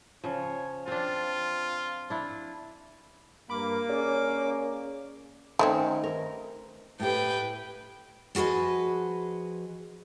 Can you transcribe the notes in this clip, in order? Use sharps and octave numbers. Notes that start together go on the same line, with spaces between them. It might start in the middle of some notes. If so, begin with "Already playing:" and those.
C#3 F3 C#5
C4 D4 F4
D4 E4
G2 A#3 B5 D6
C#4 G#4 C#5 D5
D#3 A3 C4 C#4
A#4
A2 G4 B4 G5
F3 F#4 G#4 B4 D#5